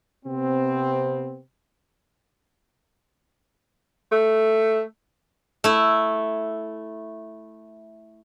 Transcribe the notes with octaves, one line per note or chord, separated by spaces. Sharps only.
C3 B3 C4
A3
A3 E4